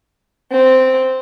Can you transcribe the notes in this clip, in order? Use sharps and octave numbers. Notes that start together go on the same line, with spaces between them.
C4